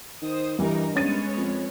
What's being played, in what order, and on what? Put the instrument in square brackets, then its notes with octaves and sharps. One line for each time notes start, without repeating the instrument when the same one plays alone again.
[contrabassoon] D#3 [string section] C5 D#6
[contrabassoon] G2 [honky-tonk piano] E3 G3 [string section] D#4 A#4
[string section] G#3 B3 C#5 [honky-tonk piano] C#4 A6 D#7
[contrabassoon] F2